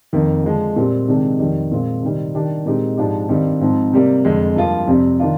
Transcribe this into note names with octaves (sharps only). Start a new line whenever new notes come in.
F2 D#3 A#3
D3 F3 G#3
A#2 G3 C4 G4
C3 D#3 G#3 D4
F2 D#3 G3
A#2 G#3 C4 F4
C3 D#3 G3 C4
D#3 G3 D4 G4
A#2 G#3 C4 D#4 G4
G#2 F3 G#3 D4 G4
G2 D#3 G3 C4
G#2 F3 C4
C3 G3 A#3
F2 D3 G#3
G2 F3 A#3 F4
F2 C3 G3 C4
D#3 A#3 D4 F4